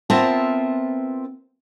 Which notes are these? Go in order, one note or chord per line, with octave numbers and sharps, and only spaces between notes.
B3 C4 F4 A#4 E5 A5